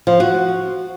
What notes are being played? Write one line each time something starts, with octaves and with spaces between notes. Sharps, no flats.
F3
F#4